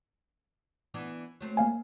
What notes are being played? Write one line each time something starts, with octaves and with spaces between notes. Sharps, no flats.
E3 B3 D4
F#3 A3 C4
A#3 F5 G#5